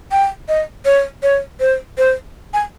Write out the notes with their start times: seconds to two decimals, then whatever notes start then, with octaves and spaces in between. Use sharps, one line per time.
0.12 G5
0.48 D#5
0.85 C#5
1.23 C#5
1.60 C5
1.98 C5
2.54 G#5